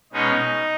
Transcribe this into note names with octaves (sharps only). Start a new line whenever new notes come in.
B2 G#3 C#4 D#4